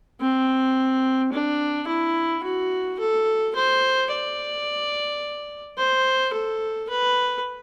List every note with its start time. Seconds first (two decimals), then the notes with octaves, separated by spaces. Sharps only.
0.21 C4
1.32 D4
1.88 E4
2.43 F#4
2.99 A4
3.56 C5
4.11 D5
5.78 C5
6.34 A4
6.89 B4